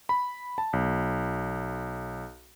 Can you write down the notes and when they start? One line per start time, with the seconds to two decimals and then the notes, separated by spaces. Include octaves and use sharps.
0.09 B5
0.58 A5
0.73 B1